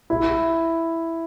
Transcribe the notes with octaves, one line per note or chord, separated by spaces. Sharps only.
E4